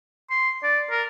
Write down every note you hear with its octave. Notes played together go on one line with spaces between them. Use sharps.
C6
D5
A#4